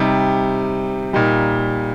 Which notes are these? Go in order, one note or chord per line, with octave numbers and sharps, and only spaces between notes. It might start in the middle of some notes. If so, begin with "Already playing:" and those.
Already playing: C3 G3 D#4
A#2 G3 D#4